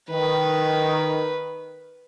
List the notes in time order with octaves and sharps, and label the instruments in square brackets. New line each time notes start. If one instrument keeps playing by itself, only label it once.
[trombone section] D#3 [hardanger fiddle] B4